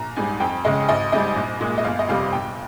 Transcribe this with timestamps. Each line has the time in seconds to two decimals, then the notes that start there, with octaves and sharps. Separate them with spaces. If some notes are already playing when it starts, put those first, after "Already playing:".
Already playing: A#1 A#5
0.16 G#2 G3 G#5
0.40 F2 G5
0.64 C#3 G#3 D#5
0.88 G#1 D#5
1.12 G#2 G3 D#5
1.36 A#1
1.61 A#2 G#3
1.78 D#5
1.84 G1 F5
1.99 D#5
2.09 F2 C3 G3 F5
2.32 A#1 G5